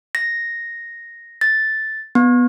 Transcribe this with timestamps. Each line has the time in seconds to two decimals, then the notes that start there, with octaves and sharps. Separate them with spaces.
0.15 A#6
1.41 A6
2.15 B3